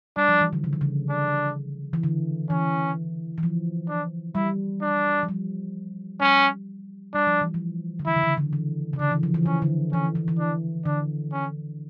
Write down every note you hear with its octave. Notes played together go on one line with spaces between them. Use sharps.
G3 D4
F3
E3
D3
C#3
D3
C#3
D4
E3
D3
E3 C#4
E3
F3
D4
G3 E4
D4
F3
G3
G3 C#4
G3 D4
F3
E3
F3
D3
E3 E4
C#3
D3
D3
E3
C#3
D3 D4
E3
F3
E3
E3 C#4
D3
E3 C#4
E3
E3
D4
D3 D4
C#4